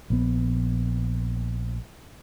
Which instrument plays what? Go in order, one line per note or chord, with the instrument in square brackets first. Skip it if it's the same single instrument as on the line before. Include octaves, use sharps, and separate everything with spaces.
[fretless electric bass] A#1 B3